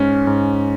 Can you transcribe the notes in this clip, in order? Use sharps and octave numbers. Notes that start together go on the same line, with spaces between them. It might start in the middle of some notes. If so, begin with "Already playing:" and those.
Already playing: G#2 C#4
G#2